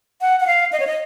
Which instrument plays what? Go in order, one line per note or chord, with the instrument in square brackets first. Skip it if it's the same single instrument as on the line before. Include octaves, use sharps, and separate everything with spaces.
[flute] F#5
F#5
F5
D#5
C#5
D#5